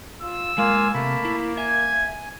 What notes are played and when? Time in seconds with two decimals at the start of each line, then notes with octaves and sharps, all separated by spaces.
0.23 F4 E6
0.58 G#3 A#3 F4 F5 G#5
0.94 C3 A3 A#3 A5 B5
1.25 E4
1.57 E5 G#5 G#6